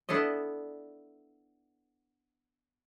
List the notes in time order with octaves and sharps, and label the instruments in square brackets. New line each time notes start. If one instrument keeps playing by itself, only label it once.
[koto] B3 D4 E4 A4 D#5